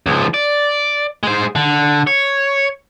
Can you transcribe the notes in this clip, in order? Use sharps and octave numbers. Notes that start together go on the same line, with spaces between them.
C#2 F3
D5
G#3 C5
D3
C#5